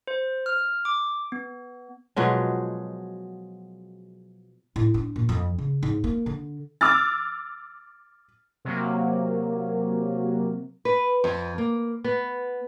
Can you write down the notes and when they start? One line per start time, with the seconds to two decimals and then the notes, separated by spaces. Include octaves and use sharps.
0.07 C5
0.46 F6
0.85 D6
1.32 B3
2.16 B2 F3 F#3 G#3
4.76 A2
4.94 D4
5.16 A#2
5.29 F2
5.58 C#3
5.83 G#2
6.04 A#3
6.26 D3
6.81 D6 E6 F6 A6
8.65 C3 F#3 A#3
10.85 B4
11.24 F2
11.58 A#3
12.04 B3